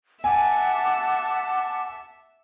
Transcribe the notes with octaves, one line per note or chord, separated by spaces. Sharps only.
E5 F#5 G#5 A5 D6